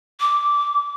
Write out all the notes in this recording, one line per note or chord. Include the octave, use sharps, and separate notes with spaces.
D6